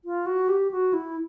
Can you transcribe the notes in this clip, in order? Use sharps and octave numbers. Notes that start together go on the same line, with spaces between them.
F4
F#4
G4
F#4
E4